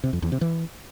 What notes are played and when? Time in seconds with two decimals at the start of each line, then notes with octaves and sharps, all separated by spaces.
0.04 C3
0.13 F2
0.22 E2
0.32 C3
0.41 E3